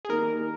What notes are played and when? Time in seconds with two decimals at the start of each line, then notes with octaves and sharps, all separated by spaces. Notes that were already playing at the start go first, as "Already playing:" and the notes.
0.05 G#4
0.09 D#3 G3 A#3 A#4
0.41 D#3